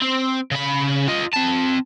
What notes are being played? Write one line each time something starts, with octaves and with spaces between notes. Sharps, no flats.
C4
C#3 B5
F4 D#5
C4 A5